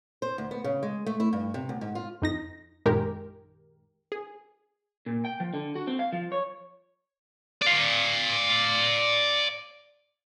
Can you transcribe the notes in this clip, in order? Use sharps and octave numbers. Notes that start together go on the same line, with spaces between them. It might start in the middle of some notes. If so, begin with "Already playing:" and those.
C5
D2
B3
C#3
G#3
A3
E4
G2
C3
D2
G#2
F4
F2 D#4 A#6
A#1 F#2 D#3 G#3 G4 A#4
G#4
A#2
G5
F3
D3
F#4
C4
F5
F3
C#5
D5 F5